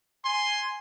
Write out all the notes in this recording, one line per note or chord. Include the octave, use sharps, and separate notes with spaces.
G#5 C6